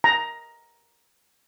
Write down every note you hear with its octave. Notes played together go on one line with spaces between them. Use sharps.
A#5